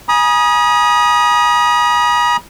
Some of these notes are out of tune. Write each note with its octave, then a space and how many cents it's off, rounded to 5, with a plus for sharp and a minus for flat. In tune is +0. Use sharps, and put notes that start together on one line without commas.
G#5 +0 B5 -45 D#6 +0